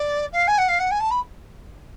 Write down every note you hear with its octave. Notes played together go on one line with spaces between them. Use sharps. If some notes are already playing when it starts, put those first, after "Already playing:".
Already playing: D5
F5
G#5
F#5
F5
F#5
G#5
A5
B5